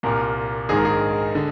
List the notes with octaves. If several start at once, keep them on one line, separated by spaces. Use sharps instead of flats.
C2 A#2 A#4
A#1 G#2 D#3 G#4
A#4
G#4
D3